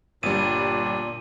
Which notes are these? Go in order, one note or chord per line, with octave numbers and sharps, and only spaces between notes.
G1 A#2 G3 D4 D#7